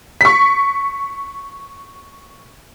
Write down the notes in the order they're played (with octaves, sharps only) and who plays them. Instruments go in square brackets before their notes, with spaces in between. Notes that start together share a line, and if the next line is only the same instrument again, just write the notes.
[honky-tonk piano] C#6 B6